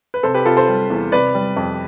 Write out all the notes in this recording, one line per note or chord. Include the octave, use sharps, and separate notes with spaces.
B4
C3 A4 C5
G4 B4
C3 F4 A4
A4 C5
G3
E2
C3 B4 D5
G3
F2